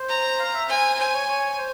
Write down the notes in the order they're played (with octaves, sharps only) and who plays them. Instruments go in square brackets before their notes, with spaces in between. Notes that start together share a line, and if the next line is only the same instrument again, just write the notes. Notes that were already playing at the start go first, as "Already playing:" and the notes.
Already playing: [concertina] C5
[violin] A#5
[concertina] F5
E5
[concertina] C5 [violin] G#5
[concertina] C5 [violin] G#5
[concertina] C#5
C#5
C5